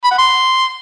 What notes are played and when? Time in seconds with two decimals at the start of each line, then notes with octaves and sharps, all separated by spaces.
0.04 B5
0.11 F#5
0.18 C6